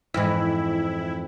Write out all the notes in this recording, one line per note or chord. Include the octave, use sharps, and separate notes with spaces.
F2 G#2 E3 E4